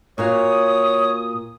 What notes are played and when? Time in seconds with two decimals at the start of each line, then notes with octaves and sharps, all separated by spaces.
0.18 A#2 F#4 C#5 F5 D#6